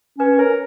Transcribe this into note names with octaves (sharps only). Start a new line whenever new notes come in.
C#4 B4
A#4 C#5